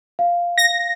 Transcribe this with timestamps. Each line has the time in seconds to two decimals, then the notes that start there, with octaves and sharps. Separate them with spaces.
0.19 F5
0.58 A#6